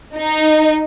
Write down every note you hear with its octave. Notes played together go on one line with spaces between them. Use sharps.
D#4